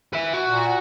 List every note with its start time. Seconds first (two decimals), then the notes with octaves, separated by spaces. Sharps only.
0.13 B4 E5
0.33 F#4
0.49 A#2